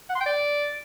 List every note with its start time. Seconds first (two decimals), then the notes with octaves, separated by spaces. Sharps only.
0.10 F#5
0.15 C6
0.21 G5
0.26 D5